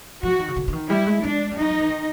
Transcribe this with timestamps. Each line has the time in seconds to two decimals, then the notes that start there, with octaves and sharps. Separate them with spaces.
0.23 F3 F#4
0.32 E3
0.39 D#3
0.48 C#3
0.56 D3
0.68 D3
0.73 D#3
0.90 G3 E4
1.07 G#3
1.22 G#3 D4
1.51 G3
1.56 F#3 D#4
1.70 F3
1.80 E3
1.89 D#3